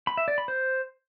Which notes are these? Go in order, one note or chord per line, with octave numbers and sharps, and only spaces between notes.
B5
E5
D5
B5
C5